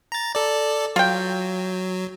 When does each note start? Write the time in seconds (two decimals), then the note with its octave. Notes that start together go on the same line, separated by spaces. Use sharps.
0.12 A#5 A6
0.35 A4 D5
0.96 F#3 F4 G5